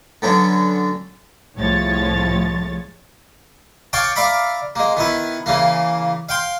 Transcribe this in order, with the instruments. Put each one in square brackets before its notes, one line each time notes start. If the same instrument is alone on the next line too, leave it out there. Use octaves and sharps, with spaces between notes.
[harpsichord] D3 F#3 B3 C#4 D4
[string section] C2 A2 F3 G#3 C#5 A6
[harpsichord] C#5 F5 G5 A5 D6
D5 E5 F5 A#5 B5 D6
G#3 A#3
D#3 B3 E4
C#3 E3 A#3
F5 G5 C6